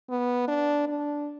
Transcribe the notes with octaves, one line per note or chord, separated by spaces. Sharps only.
B3
D4
D4